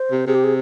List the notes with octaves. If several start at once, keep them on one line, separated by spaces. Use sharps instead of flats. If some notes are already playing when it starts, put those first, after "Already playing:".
Already playing: C5
C3
C3 G#4
G4
G#4